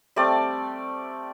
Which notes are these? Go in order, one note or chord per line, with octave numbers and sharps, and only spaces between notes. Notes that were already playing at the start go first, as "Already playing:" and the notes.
G3 A3 C4 D5